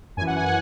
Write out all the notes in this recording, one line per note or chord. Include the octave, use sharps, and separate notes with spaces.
F#2 E3 G#5
F#5
G#5
F#5